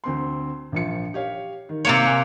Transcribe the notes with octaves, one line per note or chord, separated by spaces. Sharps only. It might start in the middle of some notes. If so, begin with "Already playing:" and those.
D2 C4 C6
A#1 F3 C#7
G4 C#5 F5
D#3
C3 A#3 C#5
G#5 F#6